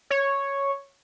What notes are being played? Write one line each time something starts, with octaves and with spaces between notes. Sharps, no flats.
C#5